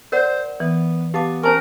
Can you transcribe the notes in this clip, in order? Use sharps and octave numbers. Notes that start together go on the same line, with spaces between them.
A#4 C5 D5 F#5
E3 B3
B3 G4 F5 A5 D6 A6
C#4 A#4 C5 G#5 A5 C#6 F6